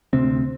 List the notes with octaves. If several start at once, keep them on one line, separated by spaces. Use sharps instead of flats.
D2 C3 C4